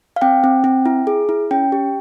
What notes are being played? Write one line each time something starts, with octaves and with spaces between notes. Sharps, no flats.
F5
C4 G5
C4
C4
E4
G#4
E4
C#4 G5
G4